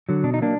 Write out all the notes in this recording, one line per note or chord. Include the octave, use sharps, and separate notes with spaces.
D3 F#3
B2 D4
D#4
F#3 A#3 D4